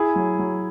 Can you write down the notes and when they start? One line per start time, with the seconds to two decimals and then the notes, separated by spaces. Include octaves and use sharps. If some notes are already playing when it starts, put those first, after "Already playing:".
Already playing: E4 G#4
0.16 F#3
0.39 F#3